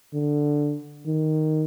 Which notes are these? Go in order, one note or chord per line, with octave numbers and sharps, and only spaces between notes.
D3
D#3